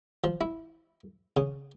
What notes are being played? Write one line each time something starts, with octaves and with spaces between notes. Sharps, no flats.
F3
E4
C#3